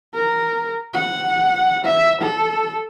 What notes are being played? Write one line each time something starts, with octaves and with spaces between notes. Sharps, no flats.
A#4
F#5
E5
A4